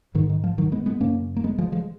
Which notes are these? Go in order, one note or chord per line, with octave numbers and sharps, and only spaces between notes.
G#2 D#3
D#3
F3
D#3 F#3
G#3 B3
G#3 B3
F#2 C#3 A#3 C#4
A#3
G#3 B3
F3 G#3
F3 G#3